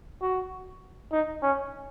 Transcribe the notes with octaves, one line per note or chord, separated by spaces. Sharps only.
F#4
D#4
C#4